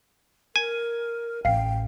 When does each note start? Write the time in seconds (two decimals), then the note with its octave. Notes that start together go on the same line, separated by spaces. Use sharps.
0.56 A#4 G#5
1.45 A1 F5 G5 C7